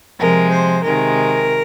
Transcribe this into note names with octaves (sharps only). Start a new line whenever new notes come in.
C3 F3 G#3 A#4
C5
C3 D#3 G#3 A#4